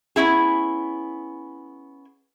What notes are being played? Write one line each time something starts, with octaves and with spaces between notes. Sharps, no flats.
B3 C#4 E4 G#4